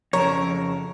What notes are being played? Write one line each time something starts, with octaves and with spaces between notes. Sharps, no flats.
F2 C#3 A4 A#4 C#5